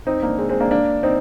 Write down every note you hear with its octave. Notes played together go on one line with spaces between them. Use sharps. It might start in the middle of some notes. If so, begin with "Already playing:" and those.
C4 D#4
A#3 D4
G#3 C4
G#3 C4
A#3 D4
A#3 D4
C4 D#4